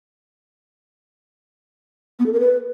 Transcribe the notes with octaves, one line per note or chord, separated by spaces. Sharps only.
B3
A4
A#4
B4